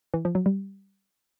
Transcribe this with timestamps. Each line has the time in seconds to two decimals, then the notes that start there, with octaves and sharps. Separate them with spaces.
0.14 E3
0.25 F3
0.35 F#3
0.46 G3